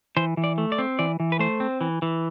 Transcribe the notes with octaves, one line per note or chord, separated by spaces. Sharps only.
E3 C5
E3
D5
A3
D5
C4
E3 D5
E3
B4
A3 C5
C4
E3
E3